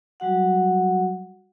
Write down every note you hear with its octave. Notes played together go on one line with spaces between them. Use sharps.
F#3 G3 F#4 F#5